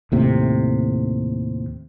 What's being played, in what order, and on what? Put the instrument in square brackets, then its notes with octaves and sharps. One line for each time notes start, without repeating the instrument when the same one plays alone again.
[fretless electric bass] D#2 A2 C3